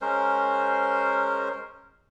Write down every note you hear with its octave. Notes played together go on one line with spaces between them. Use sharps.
G#3 C#4 A#4 C5